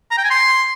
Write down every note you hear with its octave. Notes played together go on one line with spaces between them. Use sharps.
A#5
G5
G#5
C6